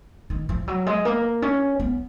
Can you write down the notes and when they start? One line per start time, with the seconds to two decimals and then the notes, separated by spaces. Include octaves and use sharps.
0.30 D#3
0.49 F3
0.68 F#3
0.86 G#3
1.05 A#3
1.42 C#4
1.80 B3